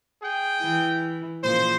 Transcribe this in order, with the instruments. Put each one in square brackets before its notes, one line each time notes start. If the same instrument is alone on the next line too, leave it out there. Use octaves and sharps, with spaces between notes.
[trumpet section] G#4 G5
[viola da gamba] E3 E4
[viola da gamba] A#2 C#3 F3 [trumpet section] C5